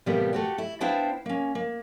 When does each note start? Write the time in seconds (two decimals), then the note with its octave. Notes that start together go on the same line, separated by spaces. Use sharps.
0.06 A2 C3 E3 G3 A#3 B3
0.33 A3 F#4 G4
0.58 E4
0.81 B3 D4 E4 C5 F5 G5
1.26 A#3 C#4
1.55 A#3